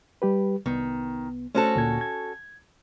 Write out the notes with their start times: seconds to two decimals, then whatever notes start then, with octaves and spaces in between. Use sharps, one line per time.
0.22 G3 G4 B4
0.66 C2 D#3 B3
1.55 A3 C#4 F#4 A4 C5
1.76 D2 A#2 G#6
2.01 G#6